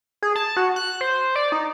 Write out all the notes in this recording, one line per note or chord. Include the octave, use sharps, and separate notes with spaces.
G#4
A5
F#4
F#6
C5
D5
D#4